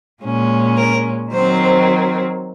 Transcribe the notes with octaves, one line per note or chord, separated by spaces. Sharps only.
A#2 G#3 C#4
A#4
D#3 F#3 C4 C5